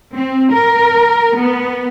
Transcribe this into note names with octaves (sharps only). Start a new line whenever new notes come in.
C4
A#4
B3